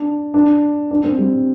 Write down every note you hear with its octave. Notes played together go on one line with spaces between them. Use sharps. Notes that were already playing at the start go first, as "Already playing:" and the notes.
Already playing: D4
D4
D4
C4
G3